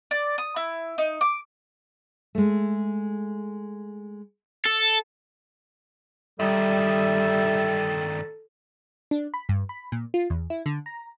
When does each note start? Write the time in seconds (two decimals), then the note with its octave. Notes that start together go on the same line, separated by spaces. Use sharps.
0.11 D5
0.38 D#6
0.56 E4
0.98 D#4
1.21 D6
2.35 G#3 A3
4.65 A4
6.40 G2 D#3 G3 A4 E5
9.11 D4
9.34 B5
9.49 G2
9.69 B5
9.92 A#2
10.14 F4
10.30 E2
10.50 E4
10.66 D3
10.86 A#5